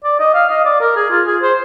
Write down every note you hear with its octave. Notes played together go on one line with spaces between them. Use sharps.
D5
D#5
F5
D#5
D5
A#4
G#4
F4
G#4
C5